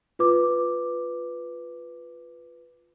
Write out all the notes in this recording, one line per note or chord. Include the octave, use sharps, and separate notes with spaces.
F4 B4 D6